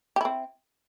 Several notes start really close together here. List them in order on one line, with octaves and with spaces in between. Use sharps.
G4 E4 C4